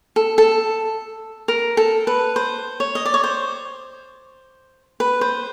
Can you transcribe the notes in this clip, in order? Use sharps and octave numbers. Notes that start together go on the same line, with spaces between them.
A4
A4
A#4
A4
B4
C5
C#5
D#5
D5
C#5
C5
B4
C5